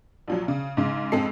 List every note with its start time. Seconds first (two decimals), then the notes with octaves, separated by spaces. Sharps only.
0.28 A#1 F3 F#3
0.48 C#3
0.77 G#2 C#3
1.12 F2 G#2 G#3 C4 A4 C7